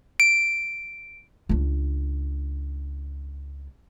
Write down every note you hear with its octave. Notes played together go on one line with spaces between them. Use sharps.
D7
C#2 D4